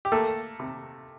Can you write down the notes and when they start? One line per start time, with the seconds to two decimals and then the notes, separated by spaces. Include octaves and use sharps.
0.05 G4
0.12 A3 A#3 A4
0.60 C3